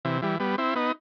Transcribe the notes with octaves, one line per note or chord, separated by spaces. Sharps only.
C3 E3
E3 G3
G3 B3
C4 E4
B3 D#4